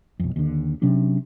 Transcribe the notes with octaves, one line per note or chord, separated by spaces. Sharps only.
B1 F2
D#2 D3
C3 F#3 C#4 D4